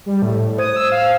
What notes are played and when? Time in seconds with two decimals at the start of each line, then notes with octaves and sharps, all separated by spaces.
0.06 G3
0.22 A2
0.58 C5 D#6 G#6
0.76 E6
0.92 F5